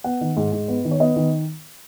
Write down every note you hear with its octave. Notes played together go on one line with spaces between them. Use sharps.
B3 F#5
D#3
G#2
G#2
B3
D#3
C#5
B3 D#5
D#3